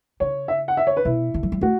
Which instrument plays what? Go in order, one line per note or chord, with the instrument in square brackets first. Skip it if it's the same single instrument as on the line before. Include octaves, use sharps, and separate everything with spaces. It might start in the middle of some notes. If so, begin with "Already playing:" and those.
[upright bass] C#3 [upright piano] C#5
[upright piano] E5
F#5
E5
C#5
B4
[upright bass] B2 [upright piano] E4
[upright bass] D3
F#3
G3
[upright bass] A3 [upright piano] F#4